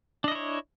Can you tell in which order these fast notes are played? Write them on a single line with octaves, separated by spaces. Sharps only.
D4 D#5 E4 C#5